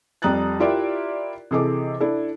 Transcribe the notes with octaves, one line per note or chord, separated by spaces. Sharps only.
F2 G3 A#5 D#6 F#6 A6
E4 F4 G4 A#4 D5 E5
C3 E3 G#4 A4 D#5 D6
D4 E4 A4